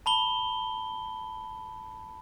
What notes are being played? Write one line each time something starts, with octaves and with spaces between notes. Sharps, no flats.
A5 B5 G7